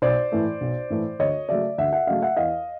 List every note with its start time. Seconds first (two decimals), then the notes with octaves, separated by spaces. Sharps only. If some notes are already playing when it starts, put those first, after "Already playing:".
0.02 B1 C5 D5
0.32 A2 E3 A3
0.61 B1
0.90 A2 E3 A3
1.19 D2 C#5 D#5
1.49 C#3 F#3 A3 D5 E5
1.78 D2 E5 F#5
1.93 E5 F#5
2.07 C#3 F#3 A3 D#5 F5
2.22 E5 F#5
2.37 E2 D#5 F5